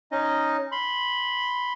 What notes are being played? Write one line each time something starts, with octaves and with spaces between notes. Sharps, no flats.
C#4 D#4 D#5
B5 C6